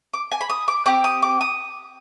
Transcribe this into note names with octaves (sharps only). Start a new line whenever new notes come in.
D6
G#5
B5
D#6
D6
C4 G4 D6
D#6
D6
D#6